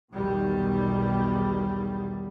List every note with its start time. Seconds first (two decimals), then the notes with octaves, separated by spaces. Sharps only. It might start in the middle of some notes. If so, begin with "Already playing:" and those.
0.13 B1 E2 B2 D#3 G3